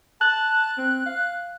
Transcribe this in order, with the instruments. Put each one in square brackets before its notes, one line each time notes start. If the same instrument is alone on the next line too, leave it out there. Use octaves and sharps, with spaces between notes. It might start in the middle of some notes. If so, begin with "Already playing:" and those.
[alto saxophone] A5 [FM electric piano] F#6
[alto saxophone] C4
F5